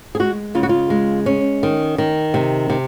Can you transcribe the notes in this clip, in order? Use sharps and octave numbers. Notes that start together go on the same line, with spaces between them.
G#4
G#3 F#4
C#3 F4
F#4
F4
G#3
C#4
D#3
D#3
C3
C3